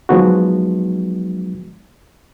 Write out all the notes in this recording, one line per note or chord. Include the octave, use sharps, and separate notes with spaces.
F3 F#3 G#3 B3 D#4 F#4